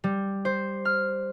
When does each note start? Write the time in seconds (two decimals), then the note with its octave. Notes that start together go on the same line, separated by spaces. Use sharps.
0.04 G3
0.45 C5
0.85 F6